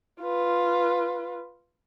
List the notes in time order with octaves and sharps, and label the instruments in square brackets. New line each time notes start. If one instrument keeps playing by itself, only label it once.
[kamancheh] F4 B4